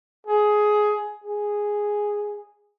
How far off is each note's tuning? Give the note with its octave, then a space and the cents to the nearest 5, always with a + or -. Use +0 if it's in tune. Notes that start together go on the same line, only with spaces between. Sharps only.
G#4 +15
G#4 -5